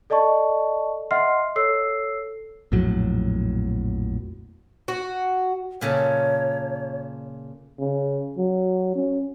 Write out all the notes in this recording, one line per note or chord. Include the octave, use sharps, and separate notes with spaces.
A4 D5 D#5 A5 C#6
D#5 E5 F#5 C6 F6 C7
A4 C#5 E6 C7
A#1 F2 A2 F#3
F#4
A#2 C#3 A4 C#5
C#3
F#3
C#4